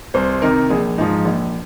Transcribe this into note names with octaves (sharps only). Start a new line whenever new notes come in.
C2 C5
C3 D#3 A#4
A#1 G#4
G#2 F3 D#4
A#1